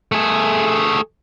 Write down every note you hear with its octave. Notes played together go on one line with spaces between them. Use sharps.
A3 G#4